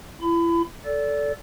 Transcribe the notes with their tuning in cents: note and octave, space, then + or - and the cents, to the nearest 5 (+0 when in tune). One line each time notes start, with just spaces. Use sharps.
E4 +35 B5 +30
A4 +0 D5 -25